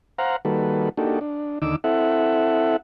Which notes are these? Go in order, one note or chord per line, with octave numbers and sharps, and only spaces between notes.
C5 F5 F#5 A#5
D#3 G3 A#3 F#4 A4 B4
A#3 D4 D#4 F#4 G4 A4
D4
D#2 D3 D#4 D6 E6
C4 E4 A4 E5 F#5